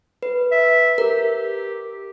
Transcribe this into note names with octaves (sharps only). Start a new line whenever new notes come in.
B4
E5
G4 A#4